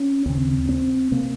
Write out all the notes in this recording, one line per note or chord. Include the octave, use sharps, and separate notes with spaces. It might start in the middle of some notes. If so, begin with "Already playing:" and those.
Already playing: C#4
D#2 C#3 C4
C4
C3 A#3